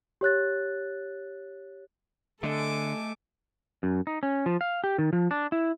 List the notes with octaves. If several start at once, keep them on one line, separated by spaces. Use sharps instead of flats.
G4 C#5 F#6 A6
D3 A3 A4 D#5 G#5 D6
F#2
D#4
C#4
F3
F5
G4
D#3
F3
D4
E4